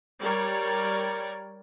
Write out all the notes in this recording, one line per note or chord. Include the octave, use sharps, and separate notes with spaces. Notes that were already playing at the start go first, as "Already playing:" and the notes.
G3 A#4 C#5 D5